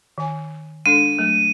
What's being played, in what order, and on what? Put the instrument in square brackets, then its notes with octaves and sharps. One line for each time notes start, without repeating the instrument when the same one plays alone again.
[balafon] D#3 G#5
[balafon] G#3 D4 A4 [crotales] D#7
[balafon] F#3 A3